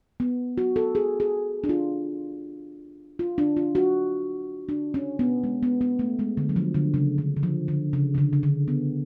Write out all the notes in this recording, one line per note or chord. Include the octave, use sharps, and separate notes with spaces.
B3
F#4
A4
G#4
G#4
D4
F4
F4
D4
F4
F#4
D4
C#4
B3
G#3
B3
B3
A3
G#3
D3
F#3
F3
D3
C#3
D3
D3
F3
D3
C#3
C#3
D3
C#3
D3
B3